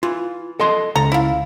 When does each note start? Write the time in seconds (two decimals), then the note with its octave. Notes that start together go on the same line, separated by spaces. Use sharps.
0.03 E3 F4
0.60 A4 D#5 C6
0.95 C#2 A4 A#5
1.12 E4 F4